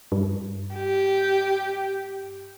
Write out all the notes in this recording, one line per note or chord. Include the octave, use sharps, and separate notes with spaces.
G2
G4